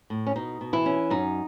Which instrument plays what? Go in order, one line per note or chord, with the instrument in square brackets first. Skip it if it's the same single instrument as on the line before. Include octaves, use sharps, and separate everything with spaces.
[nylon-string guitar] A2
C#4
B2 D#4
B2
E3 E4
C#4
F#2 D#4